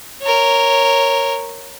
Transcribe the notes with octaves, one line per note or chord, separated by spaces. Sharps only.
A#4 C#5